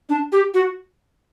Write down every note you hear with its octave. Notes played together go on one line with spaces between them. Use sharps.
D4
G4
F#4